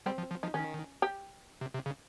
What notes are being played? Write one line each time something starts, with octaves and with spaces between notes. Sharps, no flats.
G3 C4
F3
F3
F3 D#4
D#3 C#4
G4
C3
C3
C#3